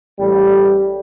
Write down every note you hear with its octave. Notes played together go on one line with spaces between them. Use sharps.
A1 G3